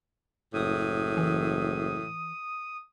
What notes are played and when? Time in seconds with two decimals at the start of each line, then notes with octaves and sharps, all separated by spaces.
0.54 F#1 A2 D#6
1.17 E3